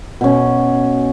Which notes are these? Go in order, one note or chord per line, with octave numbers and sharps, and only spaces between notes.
B2 C#4